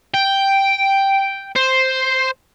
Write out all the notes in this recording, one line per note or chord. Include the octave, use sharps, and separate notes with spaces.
G5
C5